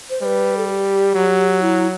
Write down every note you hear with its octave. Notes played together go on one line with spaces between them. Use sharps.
C5
G3 B4 C5
A4
G4
F#3
E4